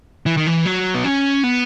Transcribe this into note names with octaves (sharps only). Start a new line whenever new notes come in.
E3
D#3
E3
F#3
B3
C#4
B3